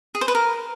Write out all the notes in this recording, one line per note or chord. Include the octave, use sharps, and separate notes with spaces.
G#4
C5
B4
A#4